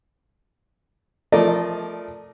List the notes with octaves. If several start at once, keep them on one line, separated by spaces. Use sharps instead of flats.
F3 A3 A#4 D5 D#5